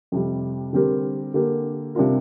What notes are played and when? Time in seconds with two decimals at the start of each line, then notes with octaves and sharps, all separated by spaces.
0.12 F2 C3 G3
0.73 D3 G3 C4 G4 A#4
1.34 D3 A#3 G4 A#4
1.95 C3 G3 D4 F4 A#4